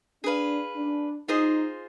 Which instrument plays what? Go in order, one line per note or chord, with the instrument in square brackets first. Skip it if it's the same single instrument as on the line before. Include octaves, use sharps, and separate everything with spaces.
[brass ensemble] D4 [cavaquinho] G#4 B4 F5
[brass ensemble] D4
[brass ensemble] D#4 [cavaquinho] F4 G#4 C5 D#5